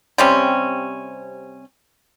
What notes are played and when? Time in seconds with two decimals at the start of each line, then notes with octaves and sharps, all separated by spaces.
0.18 C3 G3 C4 C#4